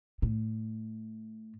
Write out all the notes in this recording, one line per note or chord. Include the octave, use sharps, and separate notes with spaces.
A2